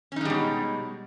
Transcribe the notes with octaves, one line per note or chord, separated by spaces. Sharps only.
B2 G3 G#3 C#4 D#4